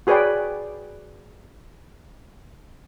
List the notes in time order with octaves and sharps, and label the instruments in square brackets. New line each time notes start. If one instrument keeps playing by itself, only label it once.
[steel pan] F#4 G#4 B4 C#5 D5 G5